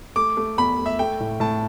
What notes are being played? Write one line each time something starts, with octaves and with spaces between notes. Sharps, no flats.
A3 D6
A3
E2 B5
A3
E5
A3 G5
A2
A2 A5